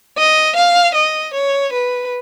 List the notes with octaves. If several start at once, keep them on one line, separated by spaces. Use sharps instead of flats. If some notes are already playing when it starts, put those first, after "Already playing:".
D#5
F5
D#5
C#5
B4